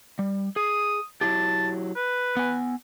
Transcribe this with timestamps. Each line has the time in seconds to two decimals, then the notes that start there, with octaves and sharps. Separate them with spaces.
0.19 G3
0.56 G#4 D#6
1.21 F#3 E4 G4 A5
1.96 B4
2.37 B3 G#5